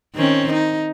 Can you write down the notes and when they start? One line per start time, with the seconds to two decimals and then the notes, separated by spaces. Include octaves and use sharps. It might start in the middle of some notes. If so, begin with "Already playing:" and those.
0.15 D#3 C4 C#4
0.53 D#4